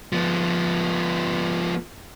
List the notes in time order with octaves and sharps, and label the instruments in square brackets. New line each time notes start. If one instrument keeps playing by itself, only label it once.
[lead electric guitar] F3 B3